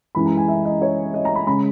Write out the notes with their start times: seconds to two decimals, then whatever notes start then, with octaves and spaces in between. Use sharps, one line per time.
0.15 F#2 E3 G#3 B5
0.26 A#5
0.37 G#5
0.48 E5
0.65 D#5
0.82 C#5
1.14 D#5
1.25 A#5
1.35 B5
1.47 C#3 G#3 B5